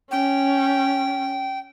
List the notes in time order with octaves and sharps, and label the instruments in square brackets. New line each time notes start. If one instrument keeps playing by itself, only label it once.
[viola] C#4 [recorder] G5